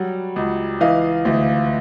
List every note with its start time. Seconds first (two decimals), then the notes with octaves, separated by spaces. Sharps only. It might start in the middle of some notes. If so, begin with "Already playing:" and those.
Already playing: F#3 G3 F#5
0.36 C#2
0.81 E3 D#5 F5
1.25 D2